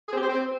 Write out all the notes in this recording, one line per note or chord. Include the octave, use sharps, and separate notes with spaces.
G#4
C4
G4
C5
C4